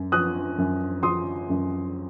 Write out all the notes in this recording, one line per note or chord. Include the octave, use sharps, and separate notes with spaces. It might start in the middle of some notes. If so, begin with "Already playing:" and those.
Already playing: F#2
F3 D#6 F#6
F#2
F3 C6 D#6
F#2